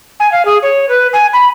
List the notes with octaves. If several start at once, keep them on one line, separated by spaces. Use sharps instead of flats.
G#5
F5
G#4
C#5
B4
G#5
B5